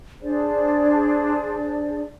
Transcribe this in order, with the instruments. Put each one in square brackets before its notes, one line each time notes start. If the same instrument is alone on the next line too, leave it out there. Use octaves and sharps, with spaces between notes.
[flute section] D4 G#4 C5 D5